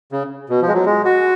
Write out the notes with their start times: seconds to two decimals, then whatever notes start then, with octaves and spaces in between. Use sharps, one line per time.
0.12 C#3
0.49 B2
0.61 F3
0.68 G#3
0.74 F#3
0.85 G#3
1.05 F#4